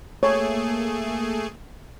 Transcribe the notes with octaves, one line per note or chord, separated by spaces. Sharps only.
A3 A#3 G#4 C#5